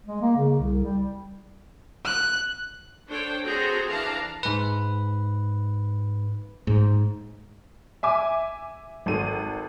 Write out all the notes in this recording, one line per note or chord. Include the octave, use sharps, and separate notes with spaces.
G#3
A#3
C#3
C2
G3
F#6
D4 A4 C5 C#5 G5
C4 F#4 G#4 A4 C5 A#5
E3 D4 F5 A5 A#5
G#2 B4
G#2
E5 G#5 D6
G#1 A4 D#7